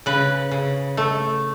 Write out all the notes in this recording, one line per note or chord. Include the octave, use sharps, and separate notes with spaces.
C#3 B4
C#3
A3